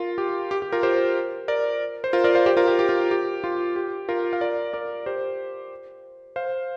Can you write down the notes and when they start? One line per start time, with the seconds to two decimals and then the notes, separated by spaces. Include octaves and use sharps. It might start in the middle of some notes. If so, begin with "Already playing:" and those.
Already playing: F4 A#4
0.18 G4
0.51 G4
0.62 G4
0.72 F4 A#4
0.83 G4 C5
1.48 A#4 D5
2.04 C5
2.13 F4 A#4
2.24 A#4 D5
2.35 C5 F5
2.46 G4 C5
2.57 F4 A#4
2.68 G4
2.79 G4
2.89 F4
3.11 G4
3.44 F4
3.76 G4
4.09 F4 A#4
4.33 F5
4.41 A#4 D5
4.73 A#4 D5
5.06 G4 C5
6.36 C5 F5